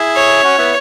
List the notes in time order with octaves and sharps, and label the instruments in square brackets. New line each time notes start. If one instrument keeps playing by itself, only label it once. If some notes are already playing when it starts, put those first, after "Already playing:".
Already playing: [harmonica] E4 G#4
[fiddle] C#5
[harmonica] C#4 F#4
B3 E4